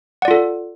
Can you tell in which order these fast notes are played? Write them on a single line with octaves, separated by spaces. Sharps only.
F#5 D5 F4 A4